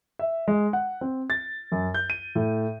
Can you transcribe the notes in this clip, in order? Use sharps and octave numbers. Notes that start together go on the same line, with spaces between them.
E5
G#3
F#5
C4
A6
F#2
G6
D#7
A2